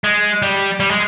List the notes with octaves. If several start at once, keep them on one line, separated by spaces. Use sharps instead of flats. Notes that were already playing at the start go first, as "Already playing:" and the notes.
G#3
G3
G3
G#3